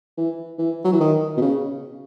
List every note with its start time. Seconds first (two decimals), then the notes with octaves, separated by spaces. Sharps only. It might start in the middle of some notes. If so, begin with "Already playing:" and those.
0.17 E3
0.59 E3
0.85 F#3
0.93 E3
1.01 D#3
1.37 B2
1.42 C#3